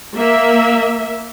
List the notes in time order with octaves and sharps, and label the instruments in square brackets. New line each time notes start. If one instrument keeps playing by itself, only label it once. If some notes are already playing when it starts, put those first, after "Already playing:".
[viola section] A#3 E5